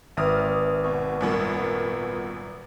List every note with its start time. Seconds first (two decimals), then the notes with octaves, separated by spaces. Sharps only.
0.17 G#1 B4 E5 D6 D#6 F6
0.84 B2
1.21 F#2 A#2 G3 B3 F4 A#4